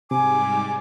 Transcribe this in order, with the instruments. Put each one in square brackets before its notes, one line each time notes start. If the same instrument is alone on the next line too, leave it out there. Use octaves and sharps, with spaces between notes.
[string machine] G#2 G3 [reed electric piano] C3 [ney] G#5 [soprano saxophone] D6